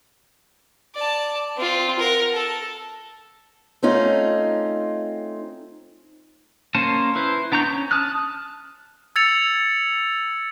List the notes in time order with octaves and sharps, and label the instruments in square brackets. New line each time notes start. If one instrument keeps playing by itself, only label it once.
[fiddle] D5 A5
C4 F4
A#4 F#5
A4
[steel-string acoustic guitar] A3 C4 C#4 D#4 F4
[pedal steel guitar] A#3 C#4 A#4 C5 A5
E4 B4 C5
B3 D4 A#5 C#6 G6
C#4
A5 D#6 F6 F#6
[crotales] E6 G#6 A6 C#7 F7